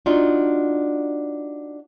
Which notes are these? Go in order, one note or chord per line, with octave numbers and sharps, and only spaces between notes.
D4 D#4 F4 F#4